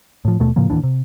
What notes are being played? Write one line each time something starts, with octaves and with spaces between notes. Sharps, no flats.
A2 F3
D#2 B2 A3
A2 C#3 F3 A#3
D1 D#2 E3 D4
C3